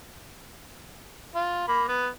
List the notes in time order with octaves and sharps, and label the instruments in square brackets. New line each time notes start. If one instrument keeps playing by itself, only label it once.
[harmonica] F4
A#3 B5
B3